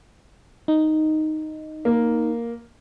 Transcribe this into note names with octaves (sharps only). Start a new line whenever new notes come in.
D#4
A#3